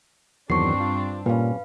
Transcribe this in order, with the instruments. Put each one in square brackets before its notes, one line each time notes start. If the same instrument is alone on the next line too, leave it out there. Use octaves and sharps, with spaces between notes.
[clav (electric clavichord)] E2 D#3 F#3 [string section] G2 C4 D4 [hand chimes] C#6 C7
[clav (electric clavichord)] F4
[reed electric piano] A#2 [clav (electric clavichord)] G3 C#4 [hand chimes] B4 F5